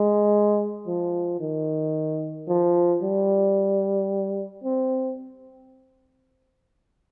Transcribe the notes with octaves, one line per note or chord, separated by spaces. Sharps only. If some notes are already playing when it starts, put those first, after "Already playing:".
Already playing: G#3
F3
D#3
F3
G3
C4